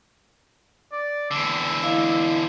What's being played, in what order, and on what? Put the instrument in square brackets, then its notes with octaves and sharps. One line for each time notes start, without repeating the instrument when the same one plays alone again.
[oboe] D5
[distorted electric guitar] E2 D3 [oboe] E6
[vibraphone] E4 D#5 F5